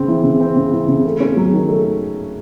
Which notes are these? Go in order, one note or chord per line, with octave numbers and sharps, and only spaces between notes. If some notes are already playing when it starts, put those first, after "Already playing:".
Already playing: C#3 C4
E3
C#3
C4
C#3
E3
C#3
A3
C#4
F#3
D#3
A3